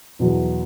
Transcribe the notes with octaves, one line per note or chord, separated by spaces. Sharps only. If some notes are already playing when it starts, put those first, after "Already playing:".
E2 B2 F#3